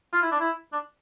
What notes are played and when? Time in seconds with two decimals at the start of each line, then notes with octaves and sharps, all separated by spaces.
0.13 F4
0.22 E4
0.31 D4
0.40 E4
0.73 D4